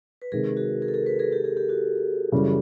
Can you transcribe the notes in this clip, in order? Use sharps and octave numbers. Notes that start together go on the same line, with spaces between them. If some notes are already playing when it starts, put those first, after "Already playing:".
B4
C3 D#3 G#3 G#4 A#4
F#4 G#4
G#4 A#4
A4
G#4 A#4
A4 B4
G#4 A#4
G4 A4
G#4 A#4
G4 A4
F#4 G#4
F#2 C#3 E3 G3